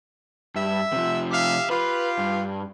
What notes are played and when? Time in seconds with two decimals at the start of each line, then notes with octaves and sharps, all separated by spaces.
0.55 G2 E5
0.93 C3 F3
1.31 G4 E5 F5
1.70 F4 G4 B4 F5
2.19 G2